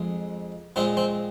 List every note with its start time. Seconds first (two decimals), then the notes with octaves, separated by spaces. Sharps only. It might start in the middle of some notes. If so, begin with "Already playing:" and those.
Already playing: F2 G#3
0.76 A#2 G#3 C4
0.97 C4